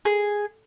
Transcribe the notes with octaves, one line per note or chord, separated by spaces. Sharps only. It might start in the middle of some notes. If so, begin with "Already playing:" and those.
G#4